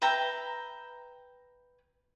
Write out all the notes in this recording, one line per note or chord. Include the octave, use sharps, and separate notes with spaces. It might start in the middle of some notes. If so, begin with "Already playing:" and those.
B4 E5 G5 A#5